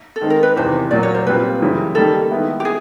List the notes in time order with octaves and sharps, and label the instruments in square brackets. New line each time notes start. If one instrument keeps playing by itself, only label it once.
[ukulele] A4
[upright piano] D#3 G#3 C4
[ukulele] A#4
B4
[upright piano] E2 C3 D#3 [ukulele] C5
[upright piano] A#2 F#3 A#3 [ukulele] D5
[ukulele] C#5
C5
[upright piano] A#2 G3 C4 F4 [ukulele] B4
[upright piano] F#2 C#3 E3 G3
[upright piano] D#3 G3 A#3 [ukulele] A4
[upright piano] D#3 G#3 B3 E4
[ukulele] G4
G#4